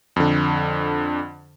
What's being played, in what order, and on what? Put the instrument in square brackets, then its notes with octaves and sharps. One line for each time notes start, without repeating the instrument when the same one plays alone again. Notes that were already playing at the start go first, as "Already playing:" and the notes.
[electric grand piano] F2 D3